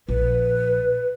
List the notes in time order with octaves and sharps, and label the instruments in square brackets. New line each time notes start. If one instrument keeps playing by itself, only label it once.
[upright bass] A#1 [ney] B4